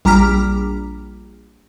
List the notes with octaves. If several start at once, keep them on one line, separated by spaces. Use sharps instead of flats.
A#1 G3 A#5 D6 F6 B6